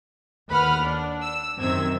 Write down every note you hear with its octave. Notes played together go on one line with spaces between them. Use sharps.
D#2 B4 F#5 B5 F6
D4
E6
F#2 C3 D#3 C5 E6 G#6